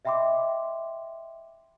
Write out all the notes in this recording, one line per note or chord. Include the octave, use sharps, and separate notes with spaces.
D#5 E5 G5 B5 C6 D6